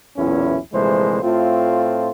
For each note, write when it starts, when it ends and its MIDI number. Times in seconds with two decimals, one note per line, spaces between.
0.17 0.58 35
0.17 0.58 40
0.17 0.58 46
0.17 0.58 61
0.17 0.58 64
0.74 1.20 34
0.74 1.20 48
0.74 1.20 52
0.74 1.20 56
0.74 1.20 57
0.74 1.20 72
1.23 2.10 45
1.23 2.10 57
1.23 2.10 60
1.23 2.10 65